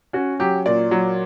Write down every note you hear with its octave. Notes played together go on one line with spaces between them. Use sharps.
C#4 F#4
F#3 G4
A#2 D5
F#3